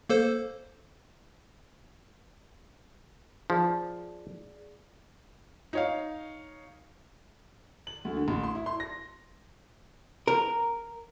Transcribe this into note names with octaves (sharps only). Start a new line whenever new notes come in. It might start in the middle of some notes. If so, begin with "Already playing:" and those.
A#3 A4 C5
F3 G#4 D5
D#4 C#5 F5
F#7
D2
D3
A1
C6
E4
C6
A#6
A#4